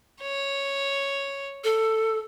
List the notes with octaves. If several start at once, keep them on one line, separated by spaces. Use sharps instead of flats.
C#5
A4